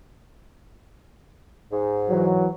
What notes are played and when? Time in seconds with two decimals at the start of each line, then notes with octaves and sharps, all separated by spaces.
1.72 G#2
2.09 E3 F#3